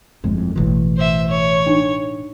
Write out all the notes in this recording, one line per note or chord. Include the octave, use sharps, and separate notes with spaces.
G1 F2 A2 G#3
A1 B2 E3 A3
C5 E5
C#5
D4 D#4